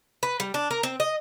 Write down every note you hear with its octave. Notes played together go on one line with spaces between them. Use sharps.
B4
G3
D4
A#4
C4
D#5